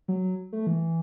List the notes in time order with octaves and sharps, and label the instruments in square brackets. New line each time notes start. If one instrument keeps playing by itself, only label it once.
[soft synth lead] F#3
A3
E3